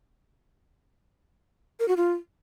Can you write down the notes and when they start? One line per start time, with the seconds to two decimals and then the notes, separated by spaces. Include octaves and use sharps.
1.80 A#4
1.88 F#4
1.97 F4